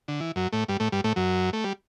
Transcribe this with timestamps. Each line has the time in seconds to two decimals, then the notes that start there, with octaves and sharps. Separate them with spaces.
0.08 D3
0.20 E3
0.36 F#2 F#3
0.52 A2 A3
0.68 G2 G3
0.80 A2 A3
0.92 G2 G3
1.04 A2 A3
1.16 F#2 F#3
1.53 A3
1.64 G3